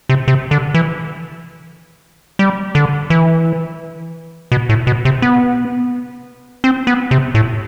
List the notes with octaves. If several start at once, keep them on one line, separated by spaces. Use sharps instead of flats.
C3
C3
D3
E3
G3
D3
E3
B2
A2
B2
C3
B3
C4
B3
C3
A2